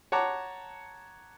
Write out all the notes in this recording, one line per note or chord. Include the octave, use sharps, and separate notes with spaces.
C#5 F#5 A5 A#5 D6